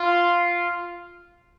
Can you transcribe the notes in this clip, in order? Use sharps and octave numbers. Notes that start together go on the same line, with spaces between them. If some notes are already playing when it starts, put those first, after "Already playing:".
Already playing: F4